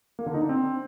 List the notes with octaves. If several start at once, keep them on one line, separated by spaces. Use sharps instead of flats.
A#3
D3
D#4
D4
C4